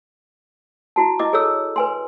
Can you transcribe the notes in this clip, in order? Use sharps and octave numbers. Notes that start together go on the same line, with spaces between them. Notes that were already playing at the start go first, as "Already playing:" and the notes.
E4 F#4 A5
E4 D#5 D6
G#4 A4 C#5 E6
B4 G#5 C6